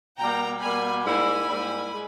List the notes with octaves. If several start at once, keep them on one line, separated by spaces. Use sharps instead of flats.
B2 G3 A#3 G5 A#5
B2 G3 A#3 G#5 B5
G#2 G3 A#3 E4 G#5 B5
G#2 G3 A#3 E4
G#3